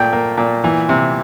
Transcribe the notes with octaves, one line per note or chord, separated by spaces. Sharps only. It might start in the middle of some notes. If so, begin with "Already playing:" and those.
Already playing: A#2 A3 G5
A#3
A#2
E3
C3